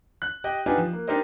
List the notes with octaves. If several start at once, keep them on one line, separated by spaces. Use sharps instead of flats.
F#6
G4 D#5 G5
B3 D4 D#4 F4 G4 G#5
F3
A#3
D4 D#4 G4 A#4 C5 D#5